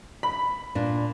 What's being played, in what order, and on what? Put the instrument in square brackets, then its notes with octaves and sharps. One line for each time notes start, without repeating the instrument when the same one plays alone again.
[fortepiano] B5
[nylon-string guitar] A#2 D4